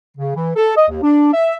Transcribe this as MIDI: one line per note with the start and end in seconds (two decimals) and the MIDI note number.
0.17 0.35 49
0.35 0.51 52
0.56 0.74 69
0.76 0.85 75
0.89 0.99 39
1.02 1.32 62
1.33 1.55 76